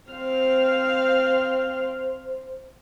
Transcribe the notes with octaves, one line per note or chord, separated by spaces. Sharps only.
C4 C5 F5